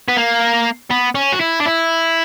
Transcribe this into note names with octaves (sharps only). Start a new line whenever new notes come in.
B3
A#3
B3
C#4
F#4
E4
D4
E4